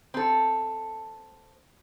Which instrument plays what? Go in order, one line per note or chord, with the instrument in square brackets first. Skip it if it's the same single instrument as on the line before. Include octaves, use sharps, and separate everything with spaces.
[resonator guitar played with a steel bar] C4 A4